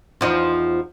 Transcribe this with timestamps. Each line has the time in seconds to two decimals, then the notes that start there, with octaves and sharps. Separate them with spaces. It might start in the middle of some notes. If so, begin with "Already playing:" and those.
0.21 E2 F3 D#4